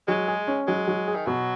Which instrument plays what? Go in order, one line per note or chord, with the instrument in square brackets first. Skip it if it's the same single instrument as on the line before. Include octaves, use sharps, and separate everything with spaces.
[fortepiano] F#3 [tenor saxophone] G#3
[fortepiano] G#4
C#4
[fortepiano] F#3 [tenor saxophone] G#3
[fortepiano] F#3
G#4
[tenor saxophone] D#3
[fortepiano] B2 [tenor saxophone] F#3